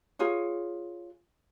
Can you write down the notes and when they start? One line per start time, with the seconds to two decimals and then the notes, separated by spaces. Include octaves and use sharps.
0.19 F4 G#4 C#5